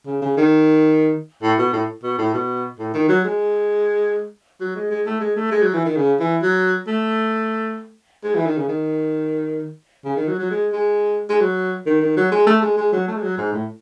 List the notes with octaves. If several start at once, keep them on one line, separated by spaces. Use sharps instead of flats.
C#3
C#3
D#3
A2
B2
A2
B2
A2
B2
A2
D#3
F#3
G#3
F#3
G#3
G#3
A3
G#3
A3
G#3
F#3
E3
D#3
C#3
E3
F#3
A3
G#3
E3
D#3
C#3
D#3
C#3
D#3
F#3
F#3
G#3
G#3
G#3
F#3
D#3
D#3
F#3
G#3
A3
G#3
G#3
F#3
A3
G#3
F#3
G#2
A2